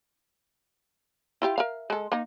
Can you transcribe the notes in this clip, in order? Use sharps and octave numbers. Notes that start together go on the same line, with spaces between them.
E4 F4 G4
A#4 E5 F5
G#3 A4
A#3 D#4